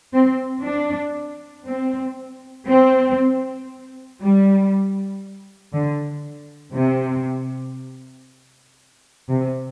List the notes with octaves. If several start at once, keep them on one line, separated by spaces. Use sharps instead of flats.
C4
D4
C4
C4
G3
D3
C3
C3